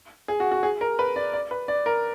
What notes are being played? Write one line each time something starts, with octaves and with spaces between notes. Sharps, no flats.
G#4
F#4
F#4
G#4
A#4
B4
D5
D5
B4
D5
A#4